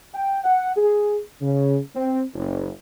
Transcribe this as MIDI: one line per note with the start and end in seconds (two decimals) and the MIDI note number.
0.14 0.40 79
0.44 0.71 78
0.76 1.19 68
1.42 1.77 49
1.95 2.23 60
2.34 2.69 30